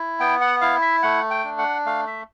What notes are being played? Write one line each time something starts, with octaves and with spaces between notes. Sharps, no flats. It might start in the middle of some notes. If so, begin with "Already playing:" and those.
Already playing: E4
B3 G5
F#5
E4 F5
E5
A3 F#5
G5
D4
F#5
A3 F5
E5